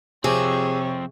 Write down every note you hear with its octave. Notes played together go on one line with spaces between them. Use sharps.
C3 F3 C4 G#4 C#5